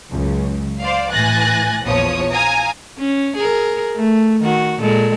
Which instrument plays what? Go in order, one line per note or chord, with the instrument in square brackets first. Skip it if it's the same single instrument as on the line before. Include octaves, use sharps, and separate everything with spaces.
[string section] C#2 F#2 C#3
C5 D5 F5
A2 E3 G#5 F#6 A6 A#6
A#1 E2 F3 C#5 D#6
F5 G#5 A#5 D#6
[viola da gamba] C#4
G#4 A#4
A3
D#3 F#4
A#2 G#3 A4